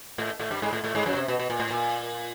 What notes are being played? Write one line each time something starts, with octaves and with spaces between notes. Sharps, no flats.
A2 A3
A2 A3
G2 G3
G#2 G#3
A2 A3
A2 A3
G#2 G#3
F#2 F#3
B2
C3
B2
B2
A#2
A2
A#2